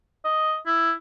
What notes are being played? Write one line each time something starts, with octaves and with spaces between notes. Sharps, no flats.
D#5
E4